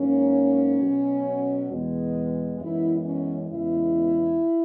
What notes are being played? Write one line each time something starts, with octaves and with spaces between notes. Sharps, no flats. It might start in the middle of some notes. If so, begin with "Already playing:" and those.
Already playing: G#2 F#3 A#3 C#4
B2 F#3 B3
E2 B2 G#3 B3
F#2 E3 G#3 B3 E4
C#4
E2 C#3 G#3 B3 E4